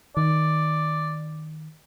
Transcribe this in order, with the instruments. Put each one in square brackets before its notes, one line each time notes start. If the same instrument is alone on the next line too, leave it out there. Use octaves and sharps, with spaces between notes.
[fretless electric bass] D#3 [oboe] D5